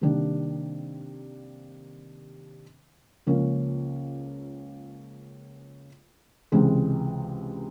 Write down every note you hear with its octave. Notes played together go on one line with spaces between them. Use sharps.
C3 D#3 G3 A#3 D4
C#2 C#3 F3 A#3 C#4
C#2 C3 E3 G#3 C4